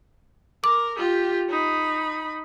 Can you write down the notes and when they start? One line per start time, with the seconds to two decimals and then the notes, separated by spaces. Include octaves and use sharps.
0.64 A#4 D6
0.97 F4 G4
1.49 D#4 B5